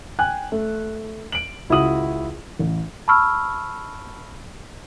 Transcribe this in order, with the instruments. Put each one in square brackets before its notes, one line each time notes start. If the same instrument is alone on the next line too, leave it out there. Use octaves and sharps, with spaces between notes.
[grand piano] G5 G#5 F#6
A3
D7 F#7
C#2 E4 F#4 D#6 F#7
A1
[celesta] A5 B5 C#6 E6 F6